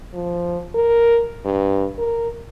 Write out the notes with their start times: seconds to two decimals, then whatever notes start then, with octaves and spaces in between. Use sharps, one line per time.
0.14 F3
0.75 A#4
1.45 G2
1.98 A#4